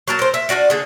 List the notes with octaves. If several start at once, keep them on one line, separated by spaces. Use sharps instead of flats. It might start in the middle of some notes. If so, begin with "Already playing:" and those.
F#3 A#4 A5
A#4 C5
E5
D4 F4 F#4 D5
D3 G#4